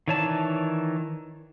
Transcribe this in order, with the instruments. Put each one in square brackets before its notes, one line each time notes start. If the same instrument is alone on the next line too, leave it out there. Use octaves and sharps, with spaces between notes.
[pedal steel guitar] D#3 E3 C#5 D5 A5